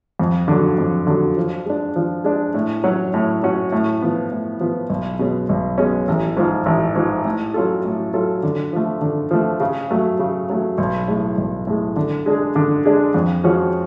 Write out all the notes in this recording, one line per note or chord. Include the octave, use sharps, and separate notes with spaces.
F2
D3 F#3
F2
D3 F#3
F3
G#3 D4
F3
G#3 D4
A2
F#3 C#4 F#4
A2
F#3 C#4 F#4
A2
F3 B3
A2
F3 B3
B1
B2 G#3 C#4
B1
B2 G#3 C#4
A1
G#2 F3
A1
G#2 F3
A2
F#3 C#4 F4 A4
A2
F#3 C#4 F4 A4
D3
F3 A3
D3
F3 A3
C#3
F#3 A3
C#3
F#3 A3
B1
A2 G#3
B1
A2 G#3
D3
G#3 D4 G#4
D3
G#3 D4 G#4
F2
F3 G#3 C#4 F#4